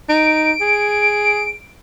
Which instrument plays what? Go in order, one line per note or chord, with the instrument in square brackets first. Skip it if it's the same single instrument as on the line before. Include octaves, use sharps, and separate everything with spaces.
[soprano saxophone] D#4 [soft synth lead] D7
[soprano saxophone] G#4